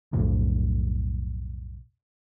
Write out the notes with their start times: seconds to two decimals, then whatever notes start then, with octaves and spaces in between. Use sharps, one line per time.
0.13 B1 F2 A2 D3